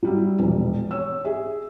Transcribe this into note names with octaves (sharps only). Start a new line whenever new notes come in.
F#3 G3 E4
E1 A#1
C#5 E6
G#4 E5